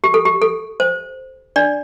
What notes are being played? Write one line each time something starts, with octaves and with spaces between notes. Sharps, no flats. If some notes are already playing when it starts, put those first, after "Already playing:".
G4
A4
G4
A4
C5
D4 D5